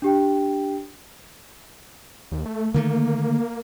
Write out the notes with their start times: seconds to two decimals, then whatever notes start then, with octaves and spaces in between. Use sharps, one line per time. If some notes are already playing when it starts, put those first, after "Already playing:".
0.02 D4 G4 G5
2.32 D#2
2.46 A3
2.74 D3 D#3 A3 A#3